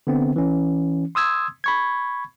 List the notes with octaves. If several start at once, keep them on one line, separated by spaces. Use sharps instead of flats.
D3 B3 C4
E3 C#4
C6 D#6 E6 G#6
B5 C#6 G#6